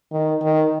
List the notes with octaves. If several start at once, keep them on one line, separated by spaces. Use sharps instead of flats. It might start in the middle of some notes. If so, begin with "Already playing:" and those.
D#3
D#3